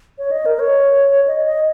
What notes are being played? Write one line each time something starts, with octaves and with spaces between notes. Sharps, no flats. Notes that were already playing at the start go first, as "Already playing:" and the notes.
C#5
D#5
A#4
C#5
D#5
D#5